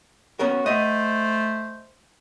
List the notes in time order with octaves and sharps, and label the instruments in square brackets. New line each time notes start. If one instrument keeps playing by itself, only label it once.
[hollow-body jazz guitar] B3 C#4 A#4 [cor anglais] F#4
[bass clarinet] A3 [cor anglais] C5 [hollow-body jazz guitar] D#5 F#5